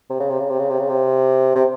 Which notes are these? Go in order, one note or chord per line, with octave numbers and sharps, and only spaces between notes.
C3
C#3
C3
C#3
C3
C#3
C3
C#3
C3
C3